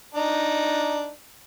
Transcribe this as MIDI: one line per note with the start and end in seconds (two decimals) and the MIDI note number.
0.14 1.10 62
0.14 1.10 63